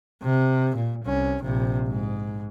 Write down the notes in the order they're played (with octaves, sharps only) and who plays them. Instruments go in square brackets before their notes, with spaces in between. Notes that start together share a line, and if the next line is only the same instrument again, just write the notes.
[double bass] C3
A#2
C2 C#4
A#1 C3
G#2